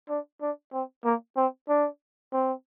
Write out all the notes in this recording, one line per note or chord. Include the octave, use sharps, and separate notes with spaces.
D4
D4
C4
A#3
C4
D4
C4